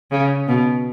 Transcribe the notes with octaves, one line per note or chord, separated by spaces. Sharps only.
C#3
B2